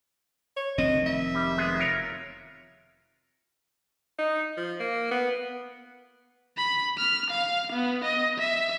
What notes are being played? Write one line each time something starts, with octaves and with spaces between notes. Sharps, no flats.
C#5
F1 D#3 C4 D#5
E5
G3
G#3 B3 G#4
F4 A#4 C#5
D#4
F3
A#3
B3
B5
F6
F5
B3
D#5
E5